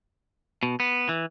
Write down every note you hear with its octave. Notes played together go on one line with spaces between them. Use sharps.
B2
B3
E3